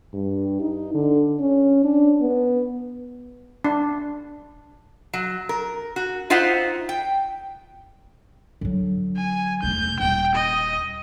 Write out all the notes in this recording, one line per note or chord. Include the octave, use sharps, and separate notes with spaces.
G2
D#4
D3
C#4
D4
B3
D4
F#3
A#4
F#4
D#4 F4 C5 E5 F#5
G5
D3 F#3
G#5
E1 A3 G6
D#1 G5
D#5